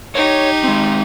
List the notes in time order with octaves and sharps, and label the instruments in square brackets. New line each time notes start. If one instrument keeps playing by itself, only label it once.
[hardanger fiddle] D#4 G4 [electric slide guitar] C#5
[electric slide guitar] G#3 C4